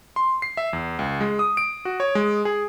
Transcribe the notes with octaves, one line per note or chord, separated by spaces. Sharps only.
C6
C7
E5
E2
C#2
G#3
D#6
D7
F#4
C#5
G#3
G#4